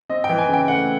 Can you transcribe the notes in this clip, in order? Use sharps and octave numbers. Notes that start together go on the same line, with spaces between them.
C4 D#5
G5
E3
G#5
C#3
G5
A3 F#5